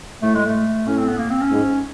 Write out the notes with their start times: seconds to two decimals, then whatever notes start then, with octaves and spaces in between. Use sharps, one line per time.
0.22 A2 A3
0.35 G#3
0.46 A3
0.87 A2 C#4
0.97 C4
1.08 B3
1.18 A#3
1.30 C4
1.41 C#4
1.51 G#2